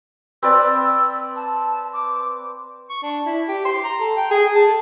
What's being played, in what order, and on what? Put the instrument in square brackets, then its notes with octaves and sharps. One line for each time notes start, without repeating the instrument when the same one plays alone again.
[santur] C4 B4 D5 [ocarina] E6
[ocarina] A5
D6
[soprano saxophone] C#6
D4
E4
G4
C6
A#5
A4
G5
G#4
A5
A4